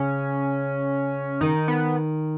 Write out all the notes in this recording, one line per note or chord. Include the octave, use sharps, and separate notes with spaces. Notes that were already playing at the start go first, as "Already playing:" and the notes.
Already playing: C#3 C#4
D#3 D#4
B3